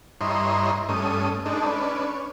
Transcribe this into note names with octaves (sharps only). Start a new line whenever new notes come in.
G2 E4 C#5 D#5 A#5 C6
G2 A3 C#4 D#6
G#3 D4 D#4 A4
C#4 D4 B4
C#5